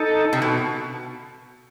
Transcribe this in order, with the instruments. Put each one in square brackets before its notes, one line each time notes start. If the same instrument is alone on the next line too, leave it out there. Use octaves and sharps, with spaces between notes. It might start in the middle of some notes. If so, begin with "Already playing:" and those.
Already playing: [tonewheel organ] D#4 A4
[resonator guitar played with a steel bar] C3
B2